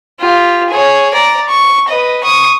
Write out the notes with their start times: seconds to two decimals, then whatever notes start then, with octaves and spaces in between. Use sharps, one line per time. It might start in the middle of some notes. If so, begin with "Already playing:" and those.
0.20 F4 G4
0.69 G#4 C#5
1.14 D5 A#5
1.48 C#6
1.89 B4 D#5
2.23 C#6 D#6